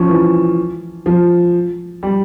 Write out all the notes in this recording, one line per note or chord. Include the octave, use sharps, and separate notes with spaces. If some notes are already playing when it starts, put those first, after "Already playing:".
Already playing: F3 C#4
E3
F3
G3